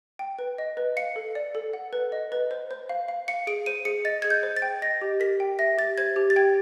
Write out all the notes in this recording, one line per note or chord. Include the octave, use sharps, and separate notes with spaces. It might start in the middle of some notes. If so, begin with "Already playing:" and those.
G5
B4
D#5
B4
F5 C#7
A4
D5
A4
F#5
B4
D#5
B4
C5
C5
F5
F5
F5 C#7
G#4 D7
C5 D#7
G#4 C#7
D#5 A6
G#4 G#6
G6
C5
A6
G5
D#5 A#6
G4
A#4 B6
G5
E5 A#6
G4 A6
C5 G#6
G4
A6
G5 G#6